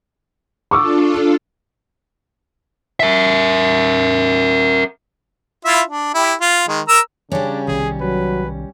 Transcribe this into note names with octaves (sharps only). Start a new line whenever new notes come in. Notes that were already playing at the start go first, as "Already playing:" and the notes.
D4 F4 A4 C#6 D6 E6
A#4 E5
E4 F4 E5
D4
E4 G4
F4
D#3 G#3
A#4 A#5 E6
C#3 G3 C#4 D4
B1 C3 D#3 G#4
F#3 B4